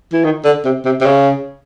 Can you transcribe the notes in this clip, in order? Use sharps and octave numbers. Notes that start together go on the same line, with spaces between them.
E3
D#3
D3
C3
C3
C3
C#3